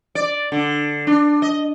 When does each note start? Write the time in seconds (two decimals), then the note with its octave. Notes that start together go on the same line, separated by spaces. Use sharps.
0.15 D5
0.52 D3
1.07 D4
1.42 D#5